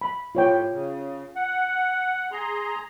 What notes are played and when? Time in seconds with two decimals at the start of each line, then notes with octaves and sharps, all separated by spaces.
0.01 B5
0.35 A2 F4 C#5 G5
0.72 C#3
1.36 F#5
2.32 G#4 A#5 C6